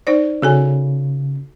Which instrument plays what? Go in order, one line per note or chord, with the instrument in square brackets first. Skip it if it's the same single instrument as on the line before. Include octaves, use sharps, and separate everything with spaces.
[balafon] D#4 C5 D5
[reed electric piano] C#3 [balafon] F#4 A4 G#5